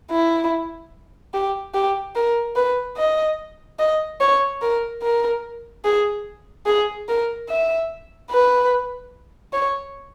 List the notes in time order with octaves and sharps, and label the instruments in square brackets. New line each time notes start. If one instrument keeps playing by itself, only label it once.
[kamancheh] E4
G4
G4
A#4
B4
D#5
D#5
C#5
A#4
A#4
G#4
G#4
A#4
E5
B4
C#5